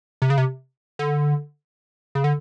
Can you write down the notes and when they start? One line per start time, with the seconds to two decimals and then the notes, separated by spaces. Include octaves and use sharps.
0.22 C3
0.30 C#3
0.38 C3
0.99 D3
2.15 C#3
2.24 D3